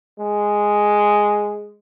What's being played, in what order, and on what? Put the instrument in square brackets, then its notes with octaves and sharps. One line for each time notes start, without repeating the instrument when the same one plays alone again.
[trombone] G#3